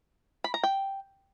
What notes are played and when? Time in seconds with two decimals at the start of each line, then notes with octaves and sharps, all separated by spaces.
0.44 B5
0.54 A#5
0.63 G5